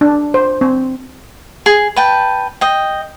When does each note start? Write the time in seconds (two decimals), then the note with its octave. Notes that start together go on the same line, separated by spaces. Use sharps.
0.01 D4
0.34 C5
0.61 C4
1.66 G#4
1.96 B4 G5 A5
2.61 D#5 G5